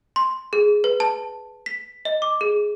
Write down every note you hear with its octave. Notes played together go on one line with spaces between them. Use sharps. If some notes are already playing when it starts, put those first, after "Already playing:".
C6
G#4
B4
A5
B6
D#5
D6
G#4